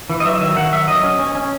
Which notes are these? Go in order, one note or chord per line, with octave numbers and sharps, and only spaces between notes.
E3
D#5
F#3 E5
D#3 E5
D#3 F#5
F#3 E5
F#3 D#5
C#4
C#4
C#4